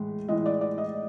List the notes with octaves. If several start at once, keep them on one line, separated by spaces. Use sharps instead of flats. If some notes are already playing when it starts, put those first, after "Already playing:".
Already playing: A2 E3 G#3
A2 E3 G#3 D#5
D5
D5
D#5